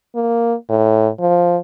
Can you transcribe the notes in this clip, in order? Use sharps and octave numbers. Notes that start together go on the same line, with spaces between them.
A#3
A2
F3